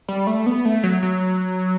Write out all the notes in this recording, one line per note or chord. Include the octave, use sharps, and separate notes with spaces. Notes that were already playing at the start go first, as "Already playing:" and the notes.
G3
A3
B3
A3
F#3
F#3